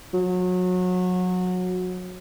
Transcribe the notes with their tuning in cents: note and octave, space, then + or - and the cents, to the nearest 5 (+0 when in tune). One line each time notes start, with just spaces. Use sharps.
F#3 -25